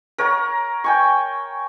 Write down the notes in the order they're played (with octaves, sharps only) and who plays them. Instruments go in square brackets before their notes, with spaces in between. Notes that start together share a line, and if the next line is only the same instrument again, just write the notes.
[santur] A#4 C#5 F#5 A#5
G5 G#5 C#6